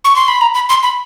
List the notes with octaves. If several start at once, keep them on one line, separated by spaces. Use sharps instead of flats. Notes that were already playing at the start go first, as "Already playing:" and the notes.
C#6
C6
B5
A#5
B5
C6
B5